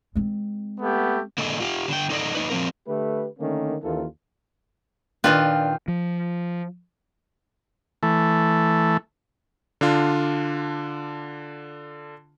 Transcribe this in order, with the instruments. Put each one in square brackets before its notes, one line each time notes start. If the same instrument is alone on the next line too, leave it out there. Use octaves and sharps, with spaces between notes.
[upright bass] G#3 C4
[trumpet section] A3 B3 G4
[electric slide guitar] D3 A#3 A4 D#5
F4 G4
D3 G5
D#4 A4 C5 D5 D#5
A#3 D#4 B4
F3 G3 C4 A#4
[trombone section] D3 A3 G4 B4
D3 D#3 A3 A#3 C#4
D#2 E3 A#3 C#4 F4 A4
[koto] A#2 D#3 F4 [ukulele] D4 B4 [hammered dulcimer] G5
[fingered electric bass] F3
[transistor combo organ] E3 A3
[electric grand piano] D3 D4 F4